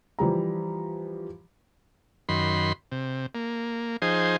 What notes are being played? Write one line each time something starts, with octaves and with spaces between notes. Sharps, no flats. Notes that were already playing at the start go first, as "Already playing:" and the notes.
E3 F3 G3 A#5
F#2 D#3 B5 C6
C3
A#3
F3 D#4 G#4 C5